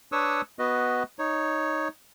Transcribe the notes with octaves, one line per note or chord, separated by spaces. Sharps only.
D4 B4 C#5 C#6 D#6 E6
B3 F#4 B4 D#5
D#4 C#5